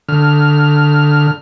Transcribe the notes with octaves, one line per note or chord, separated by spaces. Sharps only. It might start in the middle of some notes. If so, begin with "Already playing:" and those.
D3 F6